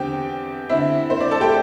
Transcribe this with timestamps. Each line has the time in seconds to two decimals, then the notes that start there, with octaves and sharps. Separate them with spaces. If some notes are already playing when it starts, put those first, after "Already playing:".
Already playing: E2 D3 C4 G4 G5
0.69 D3 C4 E4 E5
1.10 C5
1.20 D5
1.31 A4 A5
1.41 G4 G5